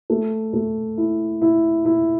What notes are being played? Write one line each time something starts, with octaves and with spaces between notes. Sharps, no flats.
A3
A3
E4
E4
E4